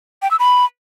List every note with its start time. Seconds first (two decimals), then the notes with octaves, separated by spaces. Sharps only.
0.22 G5
0.31 E6
0.39 B5